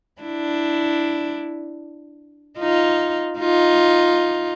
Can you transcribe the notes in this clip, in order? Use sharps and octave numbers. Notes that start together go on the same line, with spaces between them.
D4 E4
D#4 F4
D#4 F4